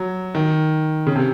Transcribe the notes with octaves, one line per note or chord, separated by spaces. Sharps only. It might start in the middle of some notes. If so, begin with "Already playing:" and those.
Already playing: F#3
D#3
C#3
C3